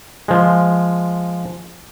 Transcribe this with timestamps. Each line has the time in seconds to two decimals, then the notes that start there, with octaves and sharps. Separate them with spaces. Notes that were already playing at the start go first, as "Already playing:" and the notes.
0.28 F3 G#3